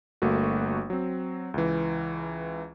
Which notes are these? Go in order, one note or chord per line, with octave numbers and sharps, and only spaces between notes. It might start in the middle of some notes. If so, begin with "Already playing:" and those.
G1 A3 A#3 F#4
F#3 C4
C#2 E3